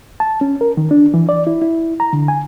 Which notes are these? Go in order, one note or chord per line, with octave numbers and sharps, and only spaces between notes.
A5
C#4
A#4
D#3
D4
E3
D5
E4
E4
A#5
D3
G#5